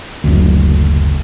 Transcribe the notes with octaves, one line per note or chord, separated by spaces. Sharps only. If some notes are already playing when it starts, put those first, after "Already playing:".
F#1 D2